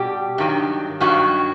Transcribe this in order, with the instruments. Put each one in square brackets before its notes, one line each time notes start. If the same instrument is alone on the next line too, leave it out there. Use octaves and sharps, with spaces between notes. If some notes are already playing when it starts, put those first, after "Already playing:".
Already playing: [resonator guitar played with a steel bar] B2 G3 G4
G2 D#3 F#3
G2 D#3 F#3 F#4